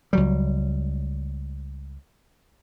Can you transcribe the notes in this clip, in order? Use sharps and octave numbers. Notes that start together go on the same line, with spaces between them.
C#2 F#3 G3